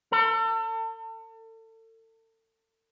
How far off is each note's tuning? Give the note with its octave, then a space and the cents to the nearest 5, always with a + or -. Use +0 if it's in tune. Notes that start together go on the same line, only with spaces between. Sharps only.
A4 +35